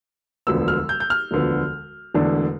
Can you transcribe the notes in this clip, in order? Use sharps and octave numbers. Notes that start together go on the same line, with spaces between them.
E1 D2 D3 F3 B3 E6
F6
G6
G6
F6
E1 D2 D3 F3 B3
E1 E2 D3 A3 D4